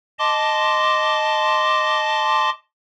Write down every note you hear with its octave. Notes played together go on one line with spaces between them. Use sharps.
D#5 A5 C6 D6